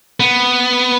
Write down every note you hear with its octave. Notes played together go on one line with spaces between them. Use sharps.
B3